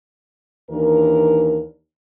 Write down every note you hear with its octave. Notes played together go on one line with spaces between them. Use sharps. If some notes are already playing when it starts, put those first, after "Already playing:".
D#2 E3 D4 A#4